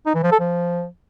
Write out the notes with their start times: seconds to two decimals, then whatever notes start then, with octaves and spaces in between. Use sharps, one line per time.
0.06 D#4
0.14 E3
0.23 F3
0.31 A4
0.40 F3